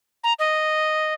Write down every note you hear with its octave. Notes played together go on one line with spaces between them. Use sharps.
A#5
D#5